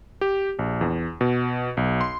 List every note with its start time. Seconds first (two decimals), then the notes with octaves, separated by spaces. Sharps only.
0.21 G4
0.59 A#1
0.81 E2
1.21 B2
1.77 B1
2.01 C6